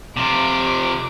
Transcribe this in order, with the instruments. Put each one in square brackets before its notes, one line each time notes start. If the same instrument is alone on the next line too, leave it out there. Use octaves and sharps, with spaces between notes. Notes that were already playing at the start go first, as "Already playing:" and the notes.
[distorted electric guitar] C3 F3 [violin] D6